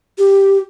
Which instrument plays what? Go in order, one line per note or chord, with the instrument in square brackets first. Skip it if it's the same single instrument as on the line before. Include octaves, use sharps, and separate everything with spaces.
[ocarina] G4